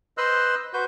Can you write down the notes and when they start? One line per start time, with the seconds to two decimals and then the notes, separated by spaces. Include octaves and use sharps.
0.18 B4 C5 D#5 C6 E6 F#6
0.73 F#4 B4 C5 G6